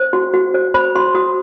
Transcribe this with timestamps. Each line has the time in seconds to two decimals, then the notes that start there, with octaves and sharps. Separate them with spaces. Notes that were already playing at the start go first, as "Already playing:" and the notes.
Already playing: C5
0.13 F#4
0.33 F#4
0.54 C5
0.74 C5 B5
0.95 F#4 C6
1.15 F#4 D#6